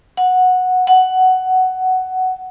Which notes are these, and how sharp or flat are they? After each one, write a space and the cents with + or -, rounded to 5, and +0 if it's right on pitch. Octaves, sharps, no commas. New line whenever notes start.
F#5 -10
F#5 +10